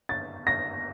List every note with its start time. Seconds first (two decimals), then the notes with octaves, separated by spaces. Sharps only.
0.09 A6
0.47 A#6